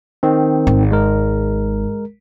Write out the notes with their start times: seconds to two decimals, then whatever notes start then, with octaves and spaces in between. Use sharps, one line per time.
0.23 D#3 C4
0.67 G#1
0.92 G#3 A#4